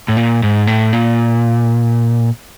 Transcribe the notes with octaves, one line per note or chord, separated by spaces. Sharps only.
A2
A#2
G#2
A2
A#2